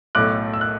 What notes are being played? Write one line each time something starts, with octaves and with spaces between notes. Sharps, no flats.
B1 A2 A3 D6 F#6
E6
F#6